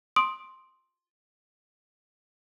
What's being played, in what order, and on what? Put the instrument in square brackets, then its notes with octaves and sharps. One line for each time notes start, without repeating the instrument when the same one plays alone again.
[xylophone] C6 D#6 D7